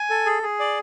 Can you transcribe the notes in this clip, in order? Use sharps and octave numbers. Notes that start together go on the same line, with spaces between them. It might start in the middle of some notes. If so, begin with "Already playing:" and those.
Already playing: G#5
A4
G#4
G#4
D5